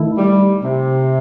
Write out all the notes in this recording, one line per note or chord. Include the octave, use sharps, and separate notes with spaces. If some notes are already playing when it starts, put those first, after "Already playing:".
Already playing: D#3 A3 E4
G3
C3